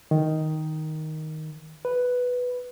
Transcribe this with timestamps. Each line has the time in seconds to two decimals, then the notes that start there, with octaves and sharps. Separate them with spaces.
0.11 D#3
1.85 B4